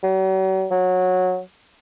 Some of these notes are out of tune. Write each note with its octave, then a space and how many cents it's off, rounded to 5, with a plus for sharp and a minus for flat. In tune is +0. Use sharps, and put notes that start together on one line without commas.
F#3 +45
F#3 -15